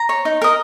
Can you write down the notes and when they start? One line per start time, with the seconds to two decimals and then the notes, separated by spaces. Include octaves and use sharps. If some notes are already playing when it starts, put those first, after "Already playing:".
Already playing: A#5
0.09 C#5
0.25 D#4
0.42 A#4 D#5